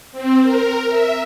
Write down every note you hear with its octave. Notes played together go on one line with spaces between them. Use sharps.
C4
A#4
E5